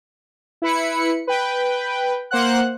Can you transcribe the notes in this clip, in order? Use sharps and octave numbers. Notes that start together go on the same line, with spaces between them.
E4 B4 B5 C#7
B4 G5
A#3 C5 F#5 F#6